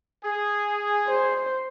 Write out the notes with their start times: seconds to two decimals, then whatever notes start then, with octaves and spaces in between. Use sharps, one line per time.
0.24 G#4
1.08 C5